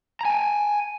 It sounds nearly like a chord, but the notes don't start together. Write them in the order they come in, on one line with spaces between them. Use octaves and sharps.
A#5 G#5 G5